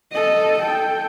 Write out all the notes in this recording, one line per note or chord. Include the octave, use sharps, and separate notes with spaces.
A4 D#5
A4 G5